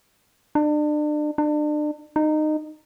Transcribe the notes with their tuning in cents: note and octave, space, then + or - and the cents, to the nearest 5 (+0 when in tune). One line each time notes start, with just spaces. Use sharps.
D4 +35
D4 +35
D#4 -20